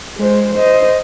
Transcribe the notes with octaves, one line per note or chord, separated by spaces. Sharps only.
G#3 C5
C5 D#5